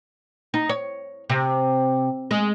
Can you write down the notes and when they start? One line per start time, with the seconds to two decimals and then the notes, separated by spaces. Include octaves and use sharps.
0.54 D#4
0.69 C#5
1.30 C3
2.31 G#3